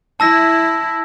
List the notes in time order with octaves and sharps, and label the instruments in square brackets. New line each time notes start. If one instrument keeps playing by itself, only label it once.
[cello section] E4 [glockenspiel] A5 E6 A#6